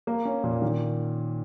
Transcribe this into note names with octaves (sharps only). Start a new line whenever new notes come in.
A#3
C#4
A#2
D#3